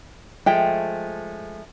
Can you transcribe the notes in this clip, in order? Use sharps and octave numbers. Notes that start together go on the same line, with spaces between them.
F3 G#3 A3 G5